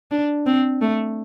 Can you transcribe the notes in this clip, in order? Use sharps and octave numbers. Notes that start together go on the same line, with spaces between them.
D4
C4
A3